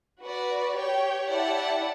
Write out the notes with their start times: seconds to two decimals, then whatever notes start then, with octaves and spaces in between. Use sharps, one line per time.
0.22 F#4 B4 D5
0.76 G4 C#5 G5
1.30 E4 G4 D5 F#5 A5